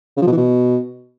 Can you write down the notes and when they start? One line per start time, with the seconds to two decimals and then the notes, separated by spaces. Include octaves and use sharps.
0.17 C#3
0.22 F3
0.27 B2
0.32 E3
0.37 B2